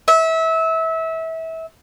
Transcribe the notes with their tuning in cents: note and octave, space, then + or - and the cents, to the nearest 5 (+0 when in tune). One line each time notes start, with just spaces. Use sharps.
E5 -25